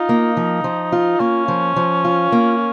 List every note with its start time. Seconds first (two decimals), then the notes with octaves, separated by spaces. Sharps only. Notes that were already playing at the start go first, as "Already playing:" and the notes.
Already playing: D#4 F4
0.09 A#3
0.37 F3
0.64 F3
0.92 F4
1.20 A#3 C#4
1.48 F3
1.76 F3
2.04 F4
2.32 A#3